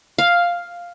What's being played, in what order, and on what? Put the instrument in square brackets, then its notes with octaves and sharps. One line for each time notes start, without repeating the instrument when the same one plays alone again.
[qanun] F5